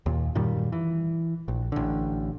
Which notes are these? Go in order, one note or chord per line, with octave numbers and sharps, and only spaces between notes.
D#2 A#2
F#2 A#2 D#3 G3
E3
A#1
A1 D3